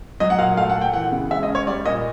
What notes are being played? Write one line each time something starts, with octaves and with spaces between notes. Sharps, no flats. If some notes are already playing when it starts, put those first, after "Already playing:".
F#3 D#5
F#5
A#2 F5
A3 F5
F#5
A#2
G5
E3 F#5
C#3
G#3 E5
D#5
C#4
C#5
G3 D5
A#2 D#5